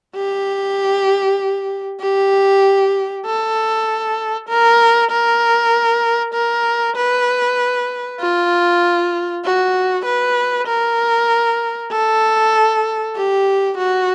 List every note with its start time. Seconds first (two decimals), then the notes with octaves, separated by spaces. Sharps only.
0.16 G4
2.00 G4
3.25 A4
4.48 A#4
5.11 A#4
6.34 A#4
6.96 B4
8.20 F4
9.45 F#4
10.06 B4
10.68 A#4
11.92 A4
13.16 G4
13.78 F#4